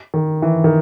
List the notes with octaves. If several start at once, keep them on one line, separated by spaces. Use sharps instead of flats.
D#3
E3
D#3